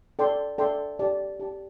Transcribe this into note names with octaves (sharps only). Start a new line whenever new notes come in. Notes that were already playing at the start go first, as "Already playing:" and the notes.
A4 D5 G5 C6
A4 D5 G5 C6
G4 D5 A5
G4 D5 A5